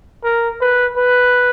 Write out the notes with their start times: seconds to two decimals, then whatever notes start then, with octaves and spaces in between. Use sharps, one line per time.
0.24 A#4
0.61 B4
0.97 B4